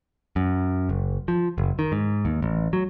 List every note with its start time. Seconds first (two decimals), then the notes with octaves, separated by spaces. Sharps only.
0.36 F#2
0.89 F#1
1.28 F3
1.58 F#1
1.79 D#3
1.92 G#2
2.25 D#2
2.43 A1
2.73 F#3